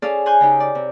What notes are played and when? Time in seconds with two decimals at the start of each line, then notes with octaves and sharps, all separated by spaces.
0.02 C#4 G#4 A4 D5 F5
0.26 F#5 G#5 C6 F#6 G6
0.40 C#3 D#4 G4
0.60 D5
0.75 C3